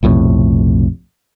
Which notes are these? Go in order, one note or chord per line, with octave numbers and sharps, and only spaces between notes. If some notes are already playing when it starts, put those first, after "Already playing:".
B1 F2 A2 C3